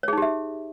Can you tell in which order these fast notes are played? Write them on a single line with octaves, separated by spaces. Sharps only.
C#5 G#4 D#4 G4 E5